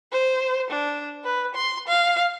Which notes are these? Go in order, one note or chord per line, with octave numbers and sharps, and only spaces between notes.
C5
D4
B4
C6
F5